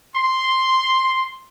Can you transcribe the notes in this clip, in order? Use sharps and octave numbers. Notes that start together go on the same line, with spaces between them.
C6